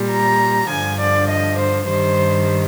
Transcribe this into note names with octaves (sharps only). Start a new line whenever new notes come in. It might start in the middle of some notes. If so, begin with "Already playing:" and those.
Already playing: A#2 G3
A#5
G2 D3 F3 G#5
D5
D#5
C5
G2 D#3 G3 C5